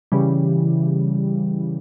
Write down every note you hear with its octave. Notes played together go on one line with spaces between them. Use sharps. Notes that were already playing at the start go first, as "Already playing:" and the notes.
C#3 E3 G3